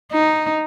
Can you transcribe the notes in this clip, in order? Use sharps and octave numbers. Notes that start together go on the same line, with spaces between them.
D#4